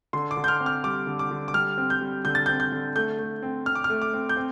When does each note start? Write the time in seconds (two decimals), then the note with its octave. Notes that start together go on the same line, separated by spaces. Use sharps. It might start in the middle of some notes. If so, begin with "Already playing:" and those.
0.13 D3 C6
0.31 D6
0.37 D3
0.44 G6
0.48 F6
0.60 C4
0.66 F6
0.84 G3 D6
1.07 D3
1.19 D6
1.31 D3
1.48 D6
1.54 G3 F6
1.78 C4
1.90 G6
2.01 G3
2.25 D3 G6
2.35 A6
2.46 C4 G6
2.60 G6
2.72 D3
2.96 A3 G6
3.19 A3
3.43 C4
3.66 C4 F6
3.75 D6
3.84 F6
3.90 A3
4.02 D6
4.13 C4
4.29 G6
4.37 C4